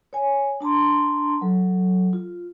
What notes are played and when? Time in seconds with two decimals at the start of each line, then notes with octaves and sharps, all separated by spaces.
0.13 C#5 G#5
0.60 D4 A5 A#5 C6
1.41 F#3 A4
2.13 F4